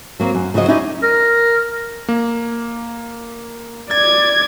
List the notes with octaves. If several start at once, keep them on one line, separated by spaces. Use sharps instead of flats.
F#3 A#3 C4
F#2
C#3 F3 F#3 F#4 D#5
C#4 D#4 E4 G4 D5 D#5
A#4
A#3
D5 G#6 A6